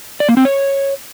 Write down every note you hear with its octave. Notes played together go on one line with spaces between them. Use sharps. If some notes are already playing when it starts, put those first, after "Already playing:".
D5
A#3
C4
C#5